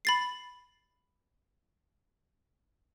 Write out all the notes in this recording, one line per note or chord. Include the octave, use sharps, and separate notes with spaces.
B5 A6 C7